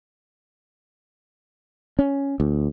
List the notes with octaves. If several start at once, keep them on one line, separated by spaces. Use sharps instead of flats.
C#4
D2